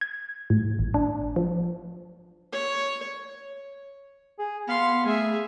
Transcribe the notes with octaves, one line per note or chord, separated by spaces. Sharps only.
G#6
A2
G#1
D4
F3
C#5
G#4
B3 F5 C6
A3 G#4 E5